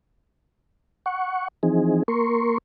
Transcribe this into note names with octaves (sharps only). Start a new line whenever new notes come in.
F#5 C#6
E3 F3 C4 D#4 G#4
A#3 A#4 C6 C#6